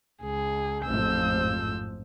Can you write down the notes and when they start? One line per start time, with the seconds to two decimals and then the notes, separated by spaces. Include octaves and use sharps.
0.23 C#2 G#4
0.86 A1 F2 G#2 F3 E6 G6